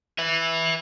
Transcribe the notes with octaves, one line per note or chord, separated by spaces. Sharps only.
B4 E5